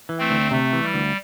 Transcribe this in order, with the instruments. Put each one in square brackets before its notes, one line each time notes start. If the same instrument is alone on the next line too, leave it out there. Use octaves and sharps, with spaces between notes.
[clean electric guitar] E3
[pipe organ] A3 C4
[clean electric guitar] D2
[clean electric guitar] C3 [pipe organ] A3
[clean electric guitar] E3
[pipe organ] G3
[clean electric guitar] D2